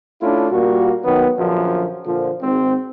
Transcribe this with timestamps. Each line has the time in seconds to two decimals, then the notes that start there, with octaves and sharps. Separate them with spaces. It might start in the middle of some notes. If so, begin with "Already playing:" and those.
0.22 A3 C#4 D4 E4 F4
0.52 A#2 G3 A#3 F#4
1.05 D#3 F#3 B3
1.38 A#1 F#2 D3 F3
2.06 A#2 D3 F3
2.42 G#1 G#2 C4